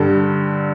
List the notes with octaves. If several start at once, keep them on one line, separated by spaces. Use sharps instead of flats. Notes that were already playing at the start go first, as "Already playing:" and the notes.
Already playing: G2 D3 G3 A4